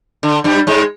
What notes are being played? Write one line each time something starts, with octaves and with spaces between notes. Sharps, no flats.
D3
G2 G3
G#2 G#3